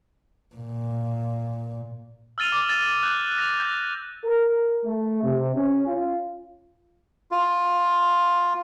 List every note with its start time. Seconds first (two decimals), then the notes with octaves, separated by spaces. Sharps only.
0.56 A#2
2.38 E6 F6 A6 D#7 F7
2.52 D6
2.69 A6
3.03 F#6 G6
3.38 A#6 F7
3.60 G6 A#6
4.25 A#4
4.85 A3
5.23 C3
5.55 C#4
5.87 F4
7.31 F4